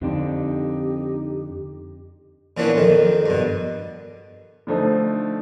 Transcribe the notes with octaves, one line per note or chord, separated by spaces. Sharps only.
F2 D3 C4 D#4 G4 D5
A#2 E3 B3 C#4 D4
F2 D#3
G2 B2
D3 F3 A3 D#4